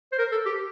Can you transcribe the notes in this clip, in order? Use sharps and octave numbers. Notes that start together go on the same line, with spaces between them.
C5
A#4
A4
G4